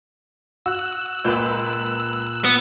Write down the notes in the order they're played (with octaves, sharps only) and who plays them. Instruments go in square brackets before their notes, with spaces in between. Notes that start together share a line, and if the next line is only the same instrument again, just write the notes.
[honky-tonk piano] F#4 [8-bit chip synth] E6 F#6
[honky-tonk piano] C#2 B4 [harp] A#2 G6
[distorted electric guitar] B3